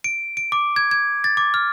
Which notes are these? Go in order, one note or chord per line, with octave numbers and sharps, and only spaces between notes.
D7
D7
D6
G#6
G#6
A6
D6
F6